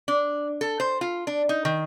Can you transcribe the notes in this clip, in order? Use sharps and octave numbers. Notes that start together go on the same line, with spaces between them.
D4
A4
C5
F4
D4
D#4
D#3